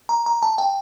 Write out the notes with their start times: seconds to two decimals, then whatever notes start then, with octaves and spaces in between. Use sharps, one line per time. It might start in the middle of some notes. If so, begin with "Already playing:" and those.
0.09 A#5
0.26 A#5
0.43 A5
0.58 G5